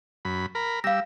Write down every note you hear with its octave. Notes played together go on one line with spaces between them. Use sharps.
F#2 B5
A#4 B5
G3 F5 E6 A#6